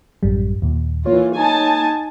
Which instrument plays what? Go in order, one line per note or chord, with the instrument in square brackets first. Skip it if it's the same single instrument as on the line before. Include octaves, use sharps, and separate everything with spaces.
[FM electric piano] A1 F#2 G3
D#2 A#2
[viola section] E3 F4 [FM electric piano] A#3 C#5
[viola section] D#4 G#5 A5